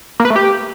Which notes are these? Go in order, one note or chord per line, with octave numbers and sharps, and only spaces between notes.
A#3
B4
A3
G4